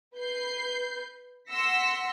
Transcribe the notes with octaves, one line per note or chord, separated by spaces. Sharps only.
B4 G6 C7
F#5 C6 E6 A#6 B6 C#7